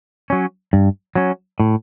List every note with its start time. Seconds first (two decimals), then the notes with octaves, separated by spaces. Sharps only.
0.30 F#3 C#4
0.73 G2
1.15 F#3 C#4
1.60 A2